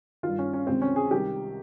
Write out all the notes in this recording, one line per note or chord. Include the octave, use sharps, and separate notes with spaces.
G2 D#3 F4
C#4
C#4
C#2 C3 D#3 C4
C#4
G#4
C2 C3 D#3 G4